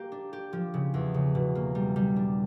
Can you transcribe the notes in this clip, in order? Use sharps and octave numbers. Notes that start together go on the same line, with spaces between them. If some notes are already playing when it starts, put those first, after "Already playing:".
Already playing: A#3 G4
D4
G4
F3
C#3
E2
C#3
B2
A#3
G3
G3
D4